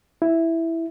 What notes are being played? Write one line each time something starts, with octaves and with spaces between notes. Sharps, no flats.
E4